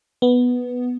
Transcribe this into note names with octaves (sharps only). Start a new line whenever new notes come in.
B3